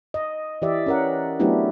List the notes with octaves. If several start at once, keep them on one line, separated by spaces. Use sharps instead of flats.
D#5
E3 G4 D5 E5
C#4 A#4 F#5
F#3 A3 B3 D4 E4 G4